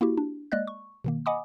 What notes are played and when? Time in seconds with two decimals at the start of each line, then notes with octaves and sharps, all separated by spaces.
0.01 A#3 E4 F#4 G4
0.17 D4
0.52 G#3 A#3 D5 D#5 F#6
0.67 C#6
1.04 B2 D#3 A#3
1.26 D#5 F#5 G#5 B5 D6 D#6